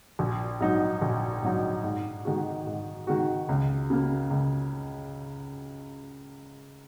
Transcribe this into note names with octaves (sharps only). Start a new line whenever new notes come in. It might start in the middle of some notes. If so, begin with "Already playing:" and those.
A#1
G#2 F#3 D#4
A#1
G#2 F#3 D#4
G#2
D#3 G#3 F#4
G#2
D#3 G#3 F#4
C#2
C#3 A#3
C#2